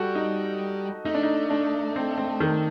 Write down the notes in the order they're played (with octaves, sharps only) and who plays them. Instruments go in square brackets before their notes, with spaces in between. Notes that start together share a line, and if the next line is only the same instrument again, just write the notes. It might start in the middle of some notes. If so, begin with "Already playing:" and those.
Already playing: [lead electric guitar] G3 [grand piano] F#4 A4
[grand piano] D#4
[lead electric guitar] A3 [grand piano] D#4
[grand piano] D4
D#4
D4
C4
C4
D#3